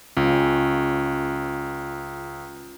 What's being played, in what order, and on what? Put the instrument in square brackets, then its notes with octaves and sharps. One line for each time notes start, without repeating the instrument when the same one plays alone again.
[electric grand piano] C#2 [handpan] C#4 F4